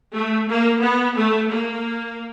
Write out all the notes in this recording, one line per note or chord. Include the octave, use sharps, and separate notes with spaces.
A3
A#3
B3
A3
A#3